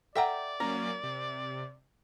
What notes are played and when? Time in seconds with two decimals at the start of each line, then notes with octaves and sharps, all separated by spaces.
0.16 A4 D5 E5 F#5 G5 A#5
0.60 F#3 A#3 C#4 A#4
1.04 C3